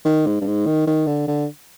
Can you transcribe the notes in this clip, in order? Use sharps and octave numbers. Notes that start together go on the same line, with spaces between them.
D#3
G#2
G2
G#2
D#3
D#3
D3
D3